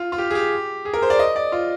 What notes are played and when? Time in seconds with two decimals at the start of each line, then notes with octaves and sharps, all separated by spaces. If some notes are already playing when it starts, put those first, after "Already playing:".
Already playing: F4
0.12 F4
0.18 G4
0.30 G#4
0.35 G4
0.85 G#4
0.94 A#4
1.02 C5
1.10 D5
1.19 D#5
1.36 D5
1.52 F4